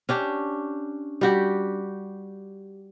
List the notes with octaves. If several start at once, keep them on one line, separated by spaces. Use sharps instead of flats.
C#4 D4 G4
G3 F#4 G4